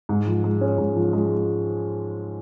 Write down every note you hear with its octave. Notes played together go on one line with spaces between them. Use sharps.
G#2
F3
G#3
C#4
G#2
F3
G#3